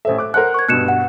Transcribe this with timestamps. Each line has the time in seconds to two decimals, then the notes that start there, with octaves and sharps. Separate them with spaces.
0.05 A1 A4 C5 E5
0.18 D6 F#6
0.34 A#4 C5 F#5 F#6
0.54 C#6 G#6
0.69 G2 B2 F#6 C#7 E7
0.88 F#5